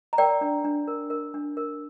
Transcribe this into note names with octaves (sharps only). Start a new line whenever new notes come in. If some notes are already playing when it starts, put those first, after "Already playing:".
A#5
A#4 D5 G5
D4
D4
A#4
A#4
D4
A#4